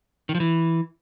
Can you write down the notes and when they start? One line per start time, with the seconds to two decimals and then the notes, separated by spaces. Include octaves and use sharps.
0.29 D#3
0.35 F3
0.40 E3